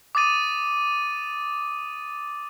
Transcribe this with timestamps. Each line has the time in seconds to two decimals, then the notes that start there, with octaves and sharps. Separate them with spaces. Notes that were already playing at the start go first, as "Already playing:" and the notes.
0.15 D6 D#6 A6 D#7